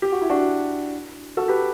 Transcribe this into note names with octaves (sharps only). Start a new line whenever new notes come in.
G4
F#4
E4
D4 F#4
F#4 A4
G4 B4